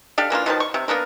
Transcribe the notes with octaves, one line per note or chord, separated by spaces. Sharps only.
D4 G4 A4 F5
E3 A#3 D4 F4
B2 D#3 F3 A5
C#6
C3
A#3 B3 D4 A#4